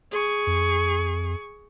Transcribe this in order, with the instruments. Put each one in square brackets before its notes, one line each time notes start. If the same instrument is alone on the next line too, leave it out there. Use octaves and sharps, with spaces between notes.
[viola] G#4 C#6
[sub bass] F2